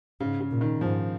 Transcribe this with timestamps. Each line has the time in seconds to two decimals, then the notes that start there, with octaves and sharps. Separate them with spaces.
0.20 G#2 C#3
0.41 C#3
0.51 A#2
0.61 D#3
0.81 G#2 F3